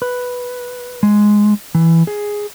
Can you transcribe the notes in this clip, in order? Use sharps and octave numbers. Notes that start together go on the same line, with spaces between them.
B4
G#3
E3
G#4